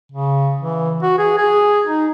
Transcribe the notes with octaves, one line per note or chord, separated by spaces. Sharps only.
C#3
E3
F#4
G#4
G#4
D#4